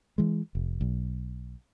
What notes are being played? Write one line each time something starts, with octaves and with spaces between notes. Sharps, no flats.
E3 G#3
F1
B1